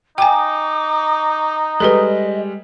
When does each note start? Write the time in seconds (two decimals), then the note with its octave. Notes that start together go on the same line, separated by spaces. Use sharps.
0.18 D#4 G5 G#5 D6
1.80 G3 G#3 A4 B4 D#5